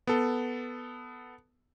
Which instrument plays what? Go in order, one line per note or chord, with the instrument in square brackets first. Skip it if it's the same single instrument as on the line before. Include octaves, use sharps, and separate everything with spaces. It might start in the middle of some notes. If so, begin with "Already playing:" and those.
[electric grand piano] B3 A4